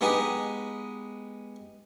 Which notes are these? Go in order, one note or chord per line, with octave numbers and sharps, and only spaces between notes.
G#3 B3 D#4 G4 G#4